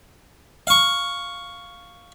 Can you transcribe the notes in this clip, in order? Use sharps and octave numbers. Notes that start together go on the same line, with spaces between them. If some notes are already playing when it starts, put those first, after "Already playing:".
F5 C#6